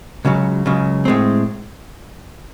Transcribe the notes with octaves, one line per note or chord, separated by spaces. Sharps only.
C#2 C#3 F#3
C#2 C#3 F#3
A2 G#3 C4